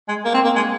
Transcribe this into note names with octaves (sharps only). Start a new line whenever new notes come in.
G#3
A#3
C4
A#3
G#3